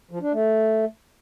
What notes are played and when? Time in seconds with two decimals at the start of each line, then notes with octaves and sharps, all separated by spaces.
0.11 F3
0.22 D4
0.32 A3